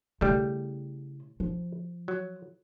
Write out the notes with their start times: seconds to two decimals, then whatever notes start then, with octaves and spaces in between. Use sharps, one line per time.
0.21 C#3 G3 A3 E4
1.40 F3
2.08 F#3